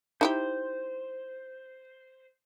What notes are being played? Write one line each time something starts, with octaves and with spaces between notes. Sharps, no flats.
D#4 E4 G4 C5